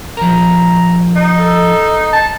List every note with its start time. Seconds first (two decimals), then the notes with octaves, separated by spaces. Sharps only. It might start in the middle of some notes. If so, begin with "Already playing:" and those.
0.17 F3 A#4 A#5
1.16 D#4
1.40 A4
2.13 A5